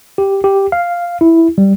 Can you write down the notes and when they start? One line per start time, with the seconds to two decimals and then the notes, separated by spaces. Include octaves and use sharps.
0.18 G4
0.44 G4
0.72 F5
1.21 E4
1.58 G3